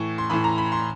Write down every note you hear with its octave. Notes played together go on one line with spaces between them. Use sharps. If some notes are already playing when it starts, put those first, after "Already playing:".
Already playing: A2 E3 C#6
C6
A2 E3 B5
A#5
B5
C6